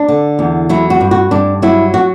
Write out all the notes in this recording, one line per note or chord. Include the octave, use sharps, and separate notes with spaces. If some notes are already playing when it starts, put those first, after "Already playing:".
Already playing: D4
D3
E2
F#3 E4
F#4
G2
F#4
G2 D4
F#3 E4
F#4